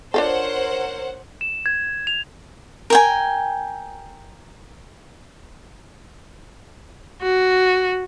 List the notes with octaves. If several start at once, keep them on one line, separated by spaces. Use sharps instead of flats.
D4 F4 A4 A#4 C5 C#5 F#5
E7
G#6
F7
A#4 G5 G#5
F#4